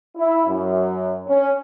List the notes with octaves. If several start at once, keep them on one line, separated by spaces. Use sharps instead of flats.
E4
F#2
C#4